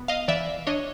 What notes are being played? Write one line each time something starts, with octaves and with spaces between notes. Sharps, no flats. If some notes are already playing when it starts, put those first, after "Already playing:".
Already playing: B3
D#5 F5
E3 D5 E5
D4 C#5 D#5